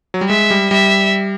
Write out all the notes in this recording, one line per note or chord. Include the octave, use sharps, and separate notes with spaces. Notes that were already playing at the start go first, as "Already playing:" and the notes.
F#3
G3
G#3 E5
G3
G3 E5